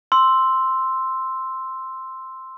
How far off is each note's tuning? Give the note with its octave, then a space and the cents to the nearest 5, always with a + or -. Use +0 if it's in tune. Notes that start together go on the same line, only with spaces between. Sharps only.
C6 +0 E6 +0